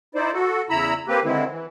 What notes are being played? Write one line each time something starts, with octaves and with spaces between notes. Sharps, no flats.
D#4 E4 C5 D5
F#4 A4
E2 C#3 E4 A#5 B5 E6
A#3 C4 G4 B4
D3 D#3 G#3 C4 E4
E3